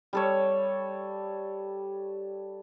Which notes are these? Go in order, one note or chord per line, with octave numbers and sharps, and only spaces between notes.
G3 A4 C#5